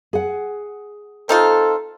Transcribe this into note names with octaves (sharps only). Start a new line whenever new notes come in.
G#4 F#5
C4 D#4 F4 A4